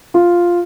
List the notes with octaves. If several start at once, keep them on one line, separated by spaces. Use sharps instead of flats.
F4